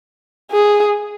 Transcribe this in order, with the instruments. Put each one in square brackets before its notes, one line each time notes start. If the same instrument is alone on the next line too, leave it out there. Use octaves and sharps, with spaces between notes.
[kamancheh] G#4